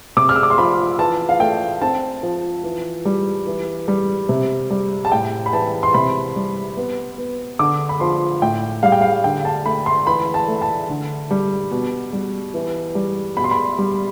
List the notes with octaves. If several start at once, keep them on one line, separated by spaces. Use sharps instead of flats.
C3 D6
F6
E6
D6
C6
F3 B5
E3 A5
F5
A3 G5
C4 A5
F3
E3
G3
E3
G3
C3
G3
A5
A2 G5
B5
E3 A5
C6
C3 B5
G3
B3
B3
D3 D6
B5
F3 C6
A2 G5
G3 F5
G5
F5
D3 G5
A5
A3 B5
C6
E3 B5
A5
A3
A5
D3
G3
B2
G3
E3
G3
B2 B5
C6
B5
G3